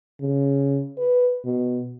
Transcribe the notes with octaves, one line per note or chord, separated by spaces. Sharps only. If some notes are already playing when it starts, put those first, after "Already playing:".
C#3
B4
B2